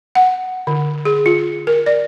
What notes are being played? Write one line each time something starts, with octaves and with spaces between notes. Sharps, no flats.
F#5
D3
G#4
F4
A#4
D5